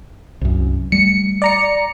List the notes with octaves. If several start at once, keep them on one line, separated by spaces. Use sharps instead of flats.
C2 F#2
G3 A3 C#7
D5 A#5 C#7